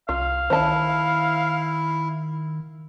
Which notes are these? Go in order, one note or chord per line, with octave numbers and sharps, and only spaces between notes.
C2 F4 F5
D#3 E4 C5 A5